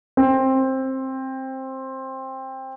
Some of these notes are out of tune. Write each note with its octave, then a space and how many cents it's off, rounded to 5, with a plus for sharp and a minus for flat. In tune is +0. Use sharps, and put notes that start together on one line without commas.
C4 +15